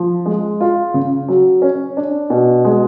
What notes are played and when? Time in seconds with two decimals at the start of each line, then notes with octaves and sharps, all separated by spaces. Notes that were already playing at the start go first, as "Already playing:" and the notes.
Already playing: F3
0.26 G#3
0.61 F4
0.94 C#3
1.28 F#3
1.62 C#4
1.97 D4
2.30 B2
2.65 G#3